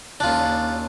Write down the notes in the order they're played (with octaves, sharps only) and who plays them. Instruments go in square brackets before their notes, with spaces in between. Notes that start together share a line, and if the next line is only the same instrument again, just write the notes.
[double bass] D#2 C#4 [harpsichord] D4 F4